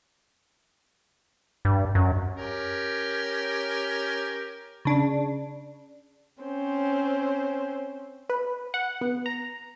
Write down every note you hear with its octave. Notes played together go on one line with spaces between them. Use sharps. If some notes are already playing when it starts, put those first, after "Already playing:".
G2
F#2
C#4 G4 A#4
C#3 D4
C4 C#4 C5
B4
F#5
B3
A#5